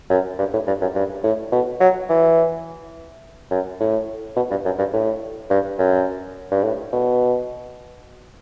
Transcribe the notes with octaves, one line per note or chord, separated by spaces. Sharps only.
F#2
G2
A2
G2
F#2
G2
A2
B2
F#3
E3
F#2
A2
B2
G2
F#2
G2
A2
G2
F#2
G2
A2
B2